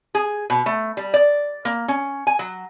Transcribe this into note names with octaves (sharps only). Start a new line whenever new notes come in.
G#4
B2
A3
G3
D5
A#3
C#4
G#5
F#3